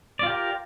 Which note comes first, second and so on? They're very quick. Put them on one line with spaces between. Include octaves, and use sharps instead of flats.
D5 F4 G4 A#4